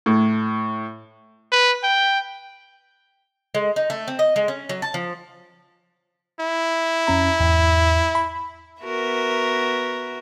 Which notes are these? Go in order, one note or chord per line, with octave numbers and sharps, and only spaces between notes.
A2
B4
G5
G#3
D#4
A3
C4
D#5
G#3
C#4
F#3
A5
F3
E4
F2 C#4 A#5
E2 G#2
B5
B3 F#4 A#4 E5